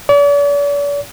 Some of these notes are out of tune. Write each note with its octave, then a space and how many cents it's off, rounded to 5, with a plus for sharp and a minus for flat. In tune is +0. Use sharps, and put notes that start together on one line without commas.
D5 -45